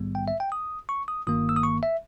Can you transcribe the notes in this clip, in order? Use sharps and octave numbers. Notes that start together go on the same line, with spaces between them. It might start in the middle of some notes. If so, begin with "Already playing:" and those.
Already playing: A#1 G#2 D#3 G3 B3
G5
E5
G5
D#6
C#6
D#6
G1 G2 D#3 A#3 D#6
E6
D#6
C#6
E5